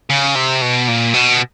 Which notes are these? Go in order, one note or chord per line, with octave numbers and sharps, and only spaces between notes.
C#3
C3
B2
A#2
B2